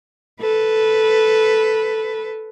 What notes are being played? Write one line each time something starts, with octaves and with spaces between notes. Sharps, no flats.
A4 B4